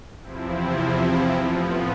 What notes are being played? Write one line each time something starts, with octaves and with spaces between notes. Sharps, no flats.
E2 C3 F3 C4 E4
A2 F3 B3